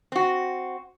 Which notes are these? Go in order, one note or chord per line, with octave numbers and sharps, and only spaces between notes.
C4 F#4